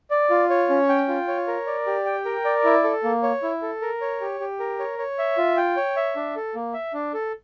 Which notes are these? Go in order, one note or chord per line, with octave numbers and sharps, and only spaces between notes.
D5
F4
C#5
C#4
G5
F4
C#5
A#4
D5
G4
G5
A#4
D5
E4
A4
A#3
C#5
E4
A4
A#4
C#5
G4
G4
A#4
C#5
C#5
E5
F4
G5
C#5
E5
D4
A4
A#3
E5
D4
A4